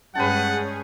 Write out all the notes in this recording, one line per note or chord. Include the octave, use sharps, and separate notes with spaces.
G2 G#3 C#4 G#4 B4 F#5 G5 A5